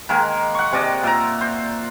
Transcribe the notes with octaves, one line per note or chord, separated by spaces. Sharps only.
D#3 G#3 A#3
F#5 C#6
C3 G#3 D5 D#5
A#2 E5 A#5
C5